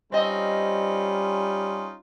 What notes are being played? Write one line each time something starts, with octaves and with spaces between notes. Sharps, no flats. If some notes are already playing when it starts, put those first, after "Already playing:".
G3 C4 C#4 D#4 F4 D#5